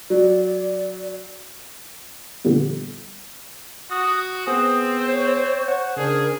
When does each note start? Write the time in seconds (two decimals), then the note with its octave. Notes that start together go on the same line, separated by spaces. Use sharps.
0.10 F#3 D5
2.45 A#2 D3 F3 G3 B3
3.90 F#4 D#6
4.47 B3 C4 G#4 C5 D#6
5.12 C#5
5.68 F#5 C#6
5.97 C#3 D4 G#4 A#4